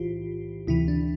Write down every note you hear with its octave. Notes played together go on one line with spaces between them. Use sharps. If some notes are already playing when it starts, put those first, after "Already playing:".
Already playing: B1 A2 E3 E4 F4 G4 C5
D2 C3 E3 E4
D4